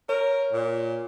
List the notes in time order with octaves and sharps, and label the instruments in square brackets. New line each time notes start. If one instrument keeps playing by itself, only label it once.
[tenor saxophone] A#4 [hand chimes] C#5
[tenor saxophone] A#2